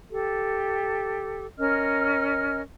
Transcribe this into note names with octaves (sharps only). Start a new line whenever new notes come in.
G4 A4
C#4 A#4 D#5 F6